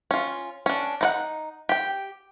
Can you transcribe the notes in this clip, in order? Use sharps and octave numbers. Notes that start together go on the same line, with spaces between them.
C#4 F4
C#4 D4
D#4 E4 F#5
G4 G5